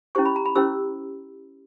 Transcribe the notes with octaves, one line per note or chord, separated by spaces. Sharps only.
C#4 E4 G4 C5 C#6
B5
A#5
B5
C#4 E4 G4 C5 E6